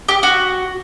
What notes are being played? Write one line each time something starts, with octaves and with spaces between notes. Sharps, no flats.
G4
F#4